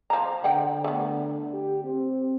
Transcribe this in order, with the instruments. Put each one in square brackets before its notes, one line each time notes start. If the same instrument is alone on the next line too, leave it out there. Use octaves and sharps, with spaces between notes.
[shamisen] F3 A#5
[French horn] D3 [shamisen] F#5 G5
[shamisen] A3 B3
[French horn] G4
C4